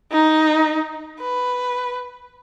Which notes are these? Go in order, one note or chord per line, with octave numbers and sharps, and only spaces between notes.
D#4
B4